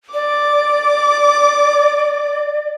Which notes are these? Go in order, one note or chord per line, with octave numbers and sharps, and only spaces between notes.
D5 D6